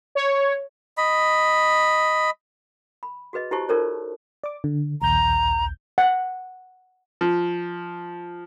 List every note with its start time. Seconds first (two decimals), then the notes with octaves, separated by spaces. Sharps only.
0.15 C#5
0.98 D#5 B5
3.03 B5
3.33 F#4 G#4 B4 D#5
3.51 E4 F#4 G4 C5 A5 C#6
3.69 D#4 F4 A4 A#4 C5 C#5
4.44 D5 D6
4.64 D3
5.02 A#1 D#2 A#5 G6
5.98 F#5
7.21 F3